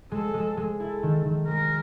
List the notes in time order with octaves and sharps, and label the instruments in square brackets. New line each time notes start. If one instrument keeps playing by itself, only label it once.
[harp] G#3 [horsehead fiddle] A4
[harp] G#3
G#3
[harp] E4 [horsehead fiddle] A4
[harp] D#3
D#3
[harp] G#3 [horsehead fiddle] A#4